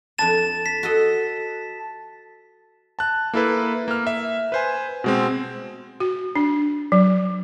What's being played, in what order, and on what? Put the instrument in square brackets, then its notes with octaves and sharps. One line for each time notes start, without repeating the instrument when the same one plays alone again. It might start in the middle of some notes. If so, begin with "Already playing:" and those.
[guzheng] F2 D4 B4 [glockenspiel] A5 A6 E7
[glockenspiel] B6
[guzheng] F#4 A4 D#5
[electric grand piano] A5 F#6
A#3 E4 A4 B4
A#3 F6
E5
B4 C5 G#5
B2 G#3 C4
[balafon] F#4
D4
F#3